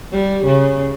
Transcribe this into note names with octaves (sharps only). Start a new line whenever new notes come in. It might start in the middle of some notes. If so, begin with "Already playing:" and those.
G3
C#3